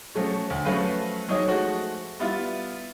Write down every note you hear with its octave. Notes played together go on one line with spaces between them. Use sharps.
F3 F#3 A3 C#4
D2
F3 F#3 A3 C#4 B4 F5
F#3 D#4 G#4 C#5 D#5 D#6
F3 G#3 A3 F#4
G3 B3 E4 F4